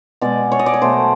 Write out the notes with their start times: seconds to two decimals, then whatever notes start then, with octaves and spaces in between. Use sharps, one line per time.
0.21 B2 G#3 D5
0.52 C#5
0.59 D#5
0.66 D5
0.74 C#5
0.81 B2 F#3 A3 C5